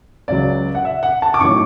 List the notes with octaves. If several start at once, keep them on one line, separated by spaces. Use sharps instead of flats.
C#2 C#3 F#3 D5
F#5
E5
F#5
A5
D6
B1 A2 F#3 C#6